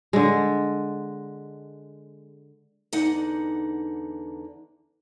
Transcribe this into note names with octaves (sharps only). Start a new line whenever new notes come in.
D3 G#3
E2 D3 D#4 F#5